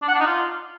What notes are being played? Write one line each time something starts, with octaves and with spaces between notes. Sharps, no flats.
D4
F#5
D4
D#4
F4